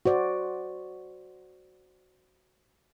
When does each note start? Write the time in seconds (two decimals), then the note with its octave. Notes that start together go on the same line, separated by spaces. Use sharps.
0.06 F#4 C5 D5